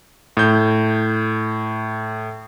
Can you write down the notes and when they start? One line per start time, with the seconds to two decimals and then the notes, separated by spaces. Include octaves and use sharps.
0.37 A2 G6